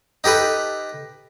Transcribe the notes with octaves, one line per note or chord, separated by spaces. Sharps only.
D#4 G4 A4 B4